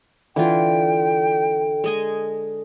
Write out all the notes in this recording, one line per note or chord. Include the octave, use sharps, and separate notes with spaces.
D3 E3 F4 G5
G#3 D#5 G#5